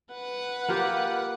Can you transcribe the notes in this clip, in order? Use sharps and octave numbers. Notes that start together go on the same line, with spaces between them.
B4 F#5
A#3 F4 G4